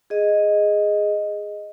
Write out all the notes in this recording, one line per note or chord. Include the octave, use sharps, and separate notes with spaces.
G#4 D#5